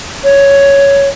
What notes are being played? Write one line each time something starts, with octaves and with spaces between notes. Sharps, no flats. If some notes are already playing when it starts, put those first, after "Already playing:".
C#5